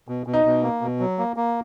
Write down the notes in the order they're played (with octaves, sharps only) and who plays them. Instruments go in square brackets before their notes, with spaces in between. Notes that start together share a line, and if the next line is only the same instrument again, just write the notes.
[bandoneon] B2
B2
[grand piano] D#4
[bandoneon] B2
A#3
B2
F#3
A#3
A#3